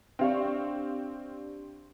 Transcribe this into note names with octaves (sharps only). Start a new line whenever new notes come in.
C4 D4 G4 D5 F5 C#6